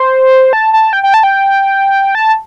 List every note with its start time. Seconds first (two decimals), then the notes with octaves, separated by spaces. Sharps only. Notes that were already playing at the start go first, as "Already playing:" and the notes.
Already playing: C5
0.53 A5
0.73 A5
0.93 G5
1.03 G5
1.14 A5
1.23 G5
2.15 A5